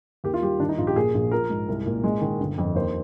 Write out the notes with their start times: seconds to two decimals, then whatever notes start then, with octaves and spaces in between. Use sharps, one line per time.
0.24 D#2 G4
0.34 F4
0.42 G3 G4
0.60 D#3 D4
0.69 D#4
0.78 A#1 F4
0.87 G4
0.96 A#2 G#4
1.14 A#1
1.31 F3 A#4
1.50 G#2
1.68 C2
1.86 A#2
2.04 G#3
2.21 D#3
2.40 G1
2.58 F2
2.75 D#2 C5